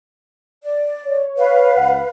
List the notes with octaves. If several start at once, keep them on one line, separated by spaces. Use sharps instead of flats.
D5
C#5
B4 F5
C#2 F#5